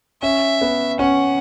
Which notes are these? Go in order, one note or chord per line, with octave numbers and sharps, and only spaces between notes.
C#4 E5
B3
C#4 F#5